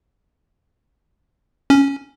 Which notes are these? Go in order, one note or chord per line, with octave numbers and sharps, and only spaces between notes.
C#4